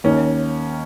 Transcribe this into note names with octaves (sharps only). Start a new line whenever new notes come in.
D#2 D#3 C#4